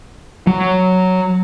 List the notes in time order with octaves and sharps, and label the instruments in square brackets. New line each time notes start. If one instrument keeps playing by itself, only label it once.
[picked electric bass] F#3